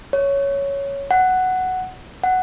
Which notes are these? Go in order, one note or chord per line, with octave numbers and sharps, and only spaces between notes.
C#5
F#5
F#5